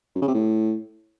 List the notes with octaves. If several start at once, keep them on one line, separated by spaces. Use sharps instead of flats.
F#2
C#3
C3
A2